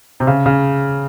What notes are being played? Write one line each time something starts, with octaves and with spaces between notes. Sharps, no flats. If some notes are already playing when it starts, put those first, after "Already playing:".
C3
C#3
C#3